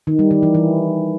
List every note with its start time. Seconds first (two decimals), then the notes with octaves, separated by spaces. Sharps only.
0.07 D#3
0.19 G3
0.31 D#3
0.43 E3
0.54 E3